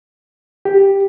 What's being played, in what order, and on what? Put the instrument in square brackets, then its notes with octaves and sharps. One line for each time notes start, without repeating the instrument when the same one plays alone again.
[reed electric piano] G4